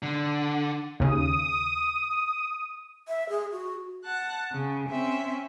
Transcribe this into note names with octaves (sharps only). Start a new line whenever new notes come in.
D3
D#2 C#3 D#6
E5
G#4
F#4
F#5 A5 F#6
C#3
C4 C#4 E5